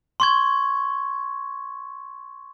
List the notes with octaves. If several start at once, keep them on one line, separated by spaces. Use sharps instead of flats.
C6 C#6 G#6